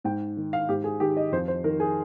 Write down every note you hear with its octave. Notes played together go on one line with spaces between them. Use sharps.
G#2 G5
D#3
F5
G#2 G4
G#4
D#3 G4
D#5
F2 C5
C5
D#3 A#4
G#4